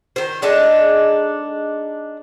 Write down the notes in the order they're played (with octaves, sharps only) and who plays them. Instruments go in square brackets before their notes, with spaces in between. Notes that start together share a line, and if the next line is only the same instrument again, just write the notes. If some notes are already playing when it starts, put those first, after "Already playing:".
[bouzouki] D#3 C5
G#3 D4 D#4 A4